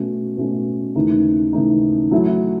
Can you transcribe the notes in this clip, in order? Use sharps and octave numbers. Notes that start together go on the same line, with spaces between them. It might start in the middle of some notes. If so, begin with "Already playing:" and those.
Already playing: B2 A3 C#4 F#4
B2 A3 C#4 F#4
D#2 C#3 E3 A3 D#4
D#2 C#3 E3 A3 D#4
F#3 A3 E4